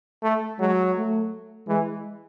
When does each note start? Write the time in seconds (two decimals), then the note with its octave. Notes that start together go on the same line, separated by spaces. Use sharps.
0.23 A3
0.59 F#3 G#3
0.96 A3
1.68 E3 G#3